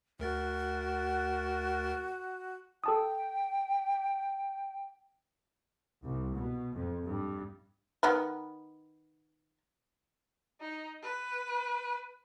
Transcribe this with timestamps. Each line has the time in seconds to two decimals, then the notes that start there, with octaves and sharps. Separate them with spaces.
0.20 D2 F#4 A#4 A6
2.84 A4 G5 A5 D#6
6.02 C2
6.35 B2
6.74 F2
7.06 G2
8.03 D#3 B3 A#4
10.60 D#4
11.03 B4